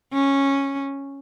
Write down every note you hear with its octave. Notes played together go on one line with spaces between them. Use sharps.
C#4